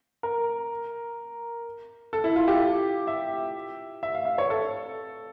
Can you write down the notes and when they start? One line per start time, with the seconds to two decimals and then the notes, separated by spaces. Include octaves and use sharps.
0.23 A#4
2.13 A4
2.24 E4
2.36 F4
2.48 G4
3.07 E5
4.03 E5
4.15 F5
4.25 E5
4.38 C#5
4.50 A4